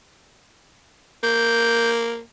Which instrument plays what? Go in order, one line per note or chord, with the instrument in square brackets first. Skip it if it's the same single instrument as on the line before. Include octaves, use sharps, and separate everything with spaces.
[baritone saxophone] A#3 [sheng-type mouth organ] G6